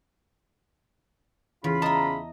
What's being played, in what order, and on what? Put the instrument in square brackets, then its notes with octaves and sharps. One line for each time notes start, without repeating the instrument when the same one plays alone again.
[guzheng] E2 [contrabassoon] C#3 [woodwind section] F4 B5
[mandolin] D#5 A#5 [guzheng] E5 A5